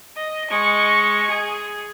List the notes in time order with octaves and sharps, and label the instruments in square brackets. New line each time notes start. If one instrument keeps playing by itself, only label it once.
[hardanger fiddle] D#5
G#3 C#6
G#4